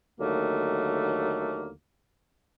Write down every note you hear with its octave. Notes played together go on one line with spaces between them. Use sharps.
D#2 D3 D#3 F#3 A3 A#3